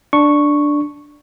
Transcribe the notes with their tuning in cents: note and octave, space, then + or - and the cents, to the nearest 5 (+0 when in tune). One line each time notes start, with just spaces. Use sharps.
D4 +0 C#6 +0